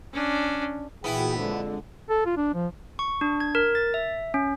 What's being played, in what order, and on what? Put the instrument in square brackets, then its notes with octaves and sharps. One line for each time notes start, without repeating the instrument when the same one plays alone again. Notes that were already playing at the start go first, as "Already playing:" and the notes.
[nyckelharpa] C#4 D4
[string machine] A#2 E3 F#4 [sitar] B3 E4 [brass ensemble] G#4 G5
[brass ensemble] F2 D3 [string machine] G#3
[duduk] A4
F4
D4
F3
[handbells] C#6
D4
G#6
A#4
A6
E5
C#4